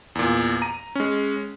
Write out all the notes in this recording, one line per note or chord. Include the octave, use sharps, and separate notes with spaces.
E2 A#2
A#5 D#7
G#3 C#4